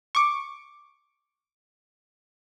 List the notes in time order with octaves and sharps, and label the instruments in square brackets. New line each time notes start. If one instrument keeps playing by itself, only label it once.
[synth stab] C#6 D6